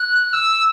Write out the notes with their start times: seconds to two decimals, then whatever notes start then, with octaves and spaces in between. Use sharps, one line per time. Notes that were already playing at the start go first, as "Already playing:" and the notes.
Already playing: F#6
0.33 E6